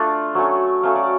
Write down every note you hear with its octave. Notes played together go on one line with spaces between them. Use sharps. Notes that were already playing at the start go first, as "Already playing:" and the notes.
Already playing: A3 D4 F4 D5
F#3 A3 C#4
F#3 A3 C#4 F5
D5